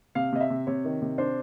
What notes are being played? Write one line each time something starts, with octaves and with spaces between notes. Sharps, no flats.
C3 F5
C3 D#5
E5
C3
C3 C#5
D#3
C3
D4 C5